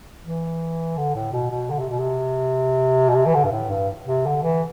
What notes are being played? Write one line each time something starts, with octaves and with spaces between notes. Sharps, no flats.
E3
D3
A2
B2
B2
D3
C3
B2
C3
B2
C3
E3
D3
G2
A2
G2
C3
D3
E3